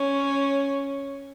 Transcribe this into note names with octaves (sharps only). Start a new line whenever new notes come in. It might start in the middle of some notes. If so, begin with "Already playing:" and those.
Already playing: C#4